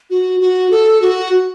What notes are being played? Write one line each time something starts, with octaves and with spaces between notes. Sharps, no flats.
F#4
F#4
A4
F#4